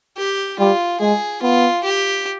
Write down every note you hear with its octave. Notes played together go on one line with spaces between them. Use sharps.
G4
G3 F4
G#3 G#4
B3 F4
G4